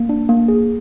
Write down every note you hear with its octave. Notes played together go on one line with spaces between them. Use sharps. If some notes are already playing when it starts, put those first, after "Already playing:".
Already playing: A#3
D4
A#3
G#4